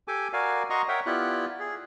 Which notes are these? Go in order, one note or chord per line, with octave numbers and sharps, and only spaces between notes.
G4 A4 G#5 D6
F#4 A#4 D5 F5 G#5
F#4 D#5 A#5 C6 C#6 D#6
A#4 C#5 E5 F#5 G5
B3 E4 F4 G4 D5 F#6
G#4